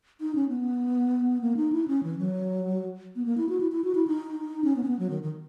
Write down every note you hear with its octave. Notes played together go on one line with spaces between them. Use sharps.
D#4
C#4
B3
A#3
D#4
E4
C#4
E3
F#3
B3
A#3
E4
F#4
E4
E4
F#4
E4
D#4
C#4
B3
C#4
B3
F#3
D#3
D#3